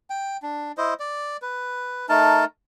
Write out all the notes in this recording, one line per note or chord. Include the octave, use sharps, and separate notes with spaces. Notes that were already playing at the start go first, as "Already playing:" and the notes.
G5
D4
E4 C5 D#5
D5
B4
A3 D#4 A#4 A5